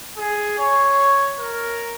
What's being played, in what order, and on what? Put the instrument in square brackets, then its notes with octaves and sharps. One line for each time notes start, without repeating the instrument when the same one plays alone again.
[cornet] G#4
C#5
A#4